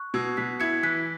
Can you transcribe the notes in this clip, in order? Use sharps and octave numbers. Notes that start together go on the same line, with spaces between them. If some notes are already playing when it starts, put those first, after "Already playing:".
Already playing: C#6 F#6
B2 E6 G#6
B2 F#6 B6
E4 G#6 C#7
E3 F#6 B6